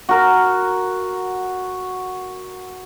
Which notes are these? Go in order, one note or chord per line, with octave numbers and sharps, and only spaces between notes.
F#4 A#4